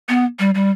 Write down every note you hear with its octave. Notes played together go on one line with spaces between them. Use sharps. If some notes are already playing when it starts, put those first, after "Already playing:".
B3
G3
G3